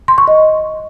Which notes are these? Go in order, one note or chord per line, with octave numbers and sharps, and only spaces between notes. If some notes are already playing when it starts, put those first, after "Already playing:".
C6
C#6
D#5